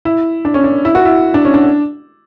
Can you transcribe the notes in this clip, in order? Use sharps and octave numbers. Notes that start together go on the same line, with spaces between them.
E4
D4
C#4
D4
E4
F#4
E4
D4
C#4
D4